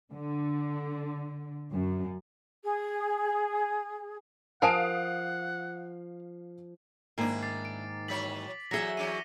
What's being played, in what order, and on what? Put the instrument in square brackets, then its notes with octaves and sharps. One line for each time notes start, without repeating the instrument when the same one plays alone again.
[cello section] D3
F#2
[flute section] G#4
[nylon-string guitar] F3 [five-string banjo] A#4 G#5 A5 [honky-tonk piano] F5 D#6 D7 [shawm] F#5
[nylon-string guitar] G#2 D#3 A#3 [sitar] D4 E4
[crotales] D6 A6 C7
D7
[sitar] E3 F#3 C#5 [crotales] B6 F#7
[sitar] E2 E5 [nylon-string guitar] F#3 G#4 [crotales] A#6 C#7 G7
[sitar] E2 C#4 [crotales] D6 D#7